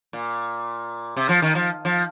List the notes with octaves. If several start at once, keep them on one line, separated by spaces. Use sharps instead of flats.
A#2
C3
F3
D#3
F3
F3